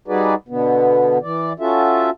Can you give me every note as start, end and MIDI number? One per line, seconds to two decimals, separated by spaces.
0.08 0.35 55
0.08 0.35 63
0.08 0.35 66
0.08 0.35 68
0.08 0.35 71
0.08 0.35 74
0.48 1.18 47
0.48 1.18 50
0.48 1.18 59
1.22 1.53 52
1.22 1.53 74
1.60 2.10 61
1.60 2.10 65
1.60 2.10 66
1.60 2.10 69
1.60 2.10 76